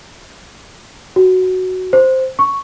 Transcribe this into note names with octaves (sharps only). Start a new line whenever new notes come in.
F#4
C5
C#6